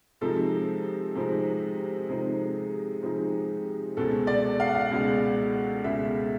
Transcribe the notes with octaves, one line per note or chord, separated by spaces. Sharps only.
C3 F3 G#3 C4 D#4 A4
C3 F3 G#3 C4 D#4
C3 F3 G#3 C4 D#4 G#4
C3 F3 G#3 C4 D#4
C#2 B2 G#3 A4
D5
F5
F#5
F5
C#2 B2 G#3
C#2 B2 G#3 E5